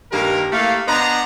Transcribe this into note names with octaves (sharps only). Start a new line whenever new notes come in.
G2 D#3 A#3 G4 A#4
A3 A#3 E4 G4 F5
B3 D4 C5 D#5 F#5 A#5